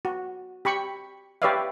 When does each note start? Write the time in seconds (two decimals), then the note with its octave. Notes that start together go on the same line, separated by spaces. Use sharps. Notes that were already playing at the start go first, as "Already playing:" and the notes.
0.05 F#4
0.65 G4 B5 C#6
1.42 G4 B4 C#5 D5 E5 F5